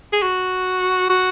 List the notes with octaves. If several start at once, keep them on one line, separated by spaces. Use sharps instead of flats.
G#4
F#4
F#4